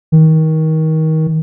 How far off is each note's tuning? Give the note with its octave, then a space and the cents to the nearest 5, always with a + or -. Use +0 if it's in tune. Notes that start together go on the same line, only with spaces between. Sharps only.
D#3 +25